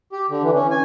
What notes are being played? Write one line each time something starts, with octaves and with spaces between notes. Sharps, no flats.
G4
D3
E3
C#4
G#5